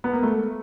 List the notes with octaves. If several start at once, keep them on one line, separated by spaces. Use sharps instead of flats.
B3
A#3
A3